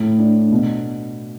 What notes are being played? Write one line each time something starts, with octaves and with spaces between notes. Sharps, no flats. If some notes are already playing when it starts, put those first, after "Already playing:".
Already playing: A2
D4
B2